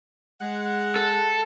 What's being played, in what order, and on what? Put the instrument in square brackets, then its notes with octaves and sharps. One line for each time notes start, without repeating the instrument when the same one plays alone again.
[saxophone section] G#3 F#5
[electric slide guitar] A4